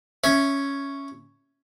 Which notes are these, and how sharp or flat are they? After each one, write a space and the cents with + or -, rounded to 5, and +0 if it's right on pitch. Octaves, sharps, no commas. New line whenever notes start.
C#4 +0 E5 +0